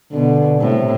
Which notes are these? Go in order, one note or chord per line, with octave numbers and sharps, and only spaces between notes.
B2 D3
A2 C3